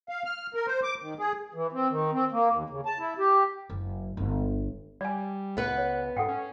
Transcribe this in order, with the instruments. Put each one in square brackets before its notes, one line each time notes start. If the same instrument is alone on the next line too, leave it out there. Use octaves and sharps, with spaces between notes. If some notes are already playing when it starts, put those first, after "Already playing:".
[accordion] F5
F6
A#4
C5
D6
D#3
G#4
[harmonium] E3
C4
D#3
C4
A#3
D#2
C#3
A5
E4
G4
[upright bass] F#1
G1
[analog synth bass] G3 [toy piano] D5 G#5
[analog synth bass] C#2 [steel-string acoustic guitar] B3 B4 F#5
[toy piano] C#5
[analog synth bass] G#2 [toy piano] A4 F#5 G5
[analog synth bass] C#4